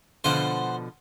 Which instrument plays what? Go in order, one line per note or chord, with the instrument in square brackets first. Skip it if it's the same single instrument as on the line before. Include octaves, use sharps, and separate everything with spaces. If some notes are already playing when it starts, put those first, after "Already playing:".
[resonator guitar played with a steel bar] B2 D3 F3 [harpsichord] C5 F#5